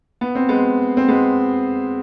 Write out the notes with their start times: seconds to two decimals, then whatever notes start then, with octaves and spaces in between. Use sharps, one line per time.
0.21 B3
0.35 C4
0.49 G#3 B3
0.97 C4
1.08 G#3 B3